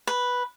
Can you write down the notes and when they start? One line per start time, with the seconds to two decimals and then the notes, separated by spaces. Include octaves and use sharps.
0.07 B4